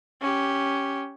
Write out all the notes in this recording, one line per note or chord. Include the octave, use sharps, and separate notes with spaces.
C#4 G4